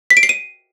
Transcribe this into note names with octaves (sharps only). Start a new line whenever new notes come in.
B6
D7
C7
D#7